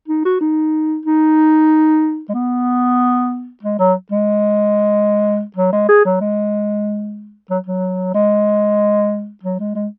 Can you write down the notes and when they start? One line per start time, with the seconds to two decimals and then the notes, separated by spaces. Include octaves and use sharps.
0.08 D#4
0.25 F#4
0.41 D#4
1.05 D#4
2.29 G#3
2.34 B3
3.63 G#3
3.79 F#3
4.11 G#3
5.56 F#3
5.73 G#3
5.89 G#4
6.05 F#3
6.21 G#3
7.50 F#3
7.66 F#3
8.14 G#3
9.43 F#3
9.59 G#3
9.75 G#3